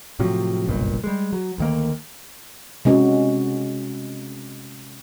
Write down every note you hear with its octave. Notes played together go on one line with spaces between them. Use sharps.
A2 C3 F3 F#3
F#1 B1 G2 A#2
G3 G#3
F#3
D2 D#3 A#3
C3 G#3 C#4 F#4